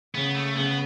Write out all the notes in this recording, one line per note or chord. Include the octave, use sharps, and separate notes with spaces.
C#3 B3
A3
C#3 B3